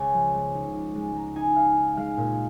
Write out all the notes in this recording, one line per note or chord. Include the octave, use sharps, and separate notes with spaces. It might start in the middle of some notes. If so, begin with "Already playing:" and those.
Already playing: C#2 C#3 C#4 C#5 D#5 G#5
F3
G#3
D#4
D#4
G#3
G#3 A#5
D#4 G#5
D#4 F5
D#4
G#3 F5
A#2